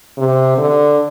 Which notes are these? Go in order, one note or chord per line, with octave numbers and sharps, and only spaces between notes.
C3
D3